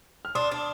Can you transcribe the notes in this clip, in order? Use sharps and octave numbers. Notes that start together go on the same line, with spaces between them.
F6
D4 C6 D#6
D4